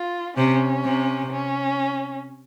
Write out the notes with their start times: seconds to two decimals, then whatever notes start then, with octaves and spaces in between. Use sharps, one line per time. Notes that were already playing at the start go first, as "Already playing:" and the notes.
Already playing: F4
0.37 C3 C#4
0.84 C3
1.31 C#4